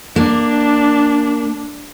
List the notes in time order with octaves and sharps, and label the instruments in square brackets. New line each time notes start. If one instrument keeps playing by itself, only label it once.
[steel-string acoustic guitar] A#3 [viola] D4